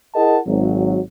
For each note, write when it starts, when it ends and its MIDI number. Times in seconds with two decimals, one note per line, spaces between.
0.15 0.38 64
0.15 0.38 68
0.15 0.38 70
0.15 0.38 75
0.15 0.38 78
0.15 0.38 81
0.46 0.98 32
0.46 0.98 54